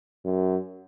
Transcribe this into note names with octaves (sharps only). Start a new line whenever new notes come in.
F#2